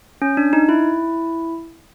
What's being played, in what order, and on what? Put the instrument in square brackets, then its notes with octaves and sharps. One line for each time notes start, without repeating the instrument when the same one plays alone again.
[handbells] C#4
D4
D#4
E4